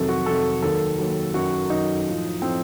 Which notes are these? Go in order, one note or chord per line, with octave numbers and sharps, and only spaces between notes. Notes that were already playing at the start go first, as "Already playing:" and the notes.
Already playing: F2 C3 D#3 F#3 A4
F#4
F2 C3 D#3 F#3 A4
D#2 D#3 F#3 A4
D#2 D#3 F#3
F#2 D#3 F#3 F#4
F#2 D#3 F#3 D#4
A2 F3
A2 F3 C4